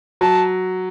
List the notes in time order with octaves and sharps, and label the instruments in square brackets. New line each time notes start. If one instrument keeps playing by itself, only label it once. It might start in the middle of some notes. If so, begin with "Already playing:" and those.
[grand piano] F#3 [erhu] A5